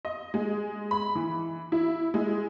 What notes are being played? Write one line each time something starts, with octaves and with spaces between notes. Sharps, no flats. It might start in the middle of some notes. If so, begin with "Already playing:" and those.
D#5
G#3
B5
E3
E4
G#3